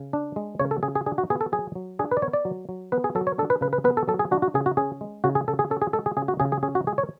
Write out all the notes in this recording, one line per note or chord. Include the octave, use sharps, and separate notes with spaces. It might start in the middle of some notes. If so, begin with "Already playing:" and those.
Already playing: C#3
D4
G#3
C#3 C#5
A4
C#3 G#4
G#4
D4 G#4
F#4
B3 G#4
A4
F#3 G#4
F#3
D4 G#4
B4
D5
B3 C#5
D5
F#3
F#3
B3 B4
G#4
F#3 A4
C#5
D4 A4
B4
C#3 B4
B4
B3 B4
A4
F#3 A4
G#4
D4 F#4
F#4
C#3 G#4
F#4
C#4 G#4
G#3
C#3 F#4
G#4
C#3 A4
G#4
C#4 A4
G#4
G#3 A4
G#4
C#3 G#4
F#4
C#3 G#4
G#4
C#4 G#4
F#4
G#3 G#4
C#5